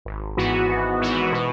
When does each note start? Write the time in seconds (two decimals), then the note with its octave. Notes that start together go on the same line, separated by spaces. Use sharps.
0.05 G#1
0.37 G#2 E3 B3 F#4
0.69 G#1
1.00 G#2 E3 B3 F#4
1.32 B2